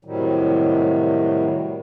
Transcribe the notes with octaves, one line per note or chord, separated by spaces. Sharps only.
A2 C3 D#3 F#3 G3